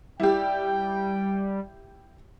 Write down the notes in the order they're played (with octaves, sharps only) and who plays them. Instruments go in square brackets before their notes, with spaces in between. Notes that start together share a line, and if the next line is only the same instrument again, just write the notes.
[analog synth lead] G3 [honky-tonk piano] E4 G4 [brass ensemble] G5